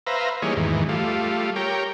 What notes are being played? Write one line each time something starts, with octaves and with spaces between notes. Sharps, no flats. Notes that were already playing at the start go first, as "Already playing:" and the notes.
B4 C5 E5 F5 A#5
E3 G3 A#3 D#4 G#4 C#5
E2 G#2 D#3 E3
G3 A3 F4
G4 A#4 C#5 G5